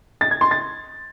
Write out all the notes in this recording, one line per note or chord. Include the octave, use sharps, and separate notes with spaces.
A6
G#6
C6
A6